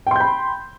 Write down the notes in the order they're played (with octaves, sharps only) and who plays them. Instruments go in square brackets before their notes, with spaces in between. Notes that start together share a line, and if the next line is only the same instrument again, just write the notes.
[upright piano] G5
C6
G6
B5